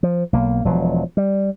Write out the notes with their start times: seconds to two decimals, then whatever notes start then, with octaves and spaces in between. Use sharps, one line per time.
0.03 F3
0.33 B1 A#3
0.65 E1 F3 F#3
1.17 G3